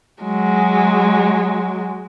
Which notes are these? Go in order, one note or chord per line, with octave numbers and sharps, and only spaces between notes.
F#3 G#3